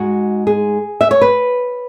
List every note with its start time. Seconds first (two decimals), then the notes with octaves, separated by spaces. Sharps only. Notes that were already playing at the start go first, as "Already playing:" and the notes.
Already playing: G#2 G#3 F#4
0.47 G#4
1.01 E5
1.11 C#5
1.21 B4